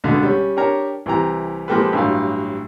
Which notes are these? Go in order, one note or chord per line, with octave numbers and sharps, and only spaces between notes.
C#2 B2 D3
G3 C#4
D4 G4 A#4 C#5 A#5
C2 E3 G4 A#5
F3 G#3 A#3 G4 A4 B4
A1 G2 F#3 F5